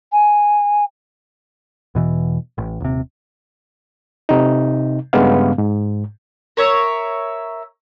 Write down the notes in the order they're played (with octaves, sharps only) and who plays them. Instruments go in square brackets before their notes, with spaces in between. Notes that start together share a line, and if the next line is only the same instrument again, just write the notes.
[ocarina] G#5
[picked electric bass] E2 B2 E3
A1
D#1 C3
[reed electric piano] C3 D#4
G2 C#3 G#3 B3 F5
G#2
[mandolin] A#4 C#5 E5